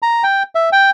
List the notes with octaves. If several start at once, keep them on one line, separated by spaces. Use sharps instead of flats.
A#5
G5
E5
G5